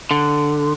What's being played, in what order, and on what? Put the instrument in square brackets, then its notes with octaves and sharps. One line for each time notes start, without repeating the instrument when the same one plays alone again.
[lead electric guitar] D3